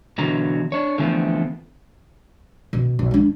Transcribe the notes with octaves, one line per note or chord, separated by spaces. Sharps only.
E2 B2 D3 F#3 A#5
D4 C#5
D3 E3 F3 A3 B3 C4
B2
B1
G#3 D4